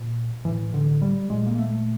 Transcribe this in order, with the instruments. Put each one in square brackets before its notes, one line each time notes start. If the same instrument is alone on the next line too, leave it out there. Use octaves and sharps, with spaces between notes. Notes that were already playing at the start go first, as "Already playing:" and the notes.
Already playing: [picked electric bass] A#2
A2 E3
D3
G3
A#2 G#3
A#3
A3